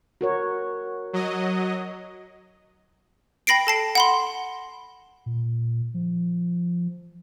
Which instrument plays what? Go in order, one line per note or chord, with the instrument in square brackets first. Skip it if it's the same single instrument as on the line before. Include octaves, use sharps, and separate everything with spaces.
[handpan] F#4 A#4 C#5
[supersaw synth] F#3 D#5
[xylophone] G5 B5 A#6 C7 D7
A4 A5 C7
F#5 B5 C6
[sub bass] A#2
F3